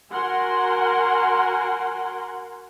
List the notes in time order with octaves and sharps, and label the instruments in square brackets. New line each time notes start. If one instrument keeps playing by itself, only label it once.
[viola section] F#4 A#4 F#5 G#5 C6